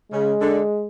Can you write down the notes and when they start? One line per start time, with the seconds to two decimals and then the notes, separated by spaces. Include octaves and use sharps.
0.12 C#3 G#3
0.40 D3